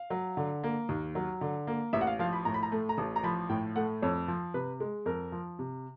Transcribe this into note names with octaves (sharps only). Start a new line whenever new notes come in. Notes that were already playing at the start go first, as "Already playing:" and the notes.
Already playing: F5
F#3
D3
A#3
D#2
F#3
D3
A#3
A1 E5
F#5
F5
F3 F5
B5
A2 A#5
B5
A#5
A3
A#5
A1 A5
A#5
F3 B5
A2 G5
A3 F#5
F2 C#5
F3
C3 B4
G#3
F2 A#4
F3
C3